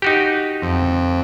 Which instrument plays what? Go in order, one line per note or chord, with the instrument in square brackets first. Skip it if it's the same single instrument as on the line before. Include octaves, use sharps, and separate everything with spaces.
[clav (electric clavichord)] D#4 F#4 G4
[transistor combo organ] F2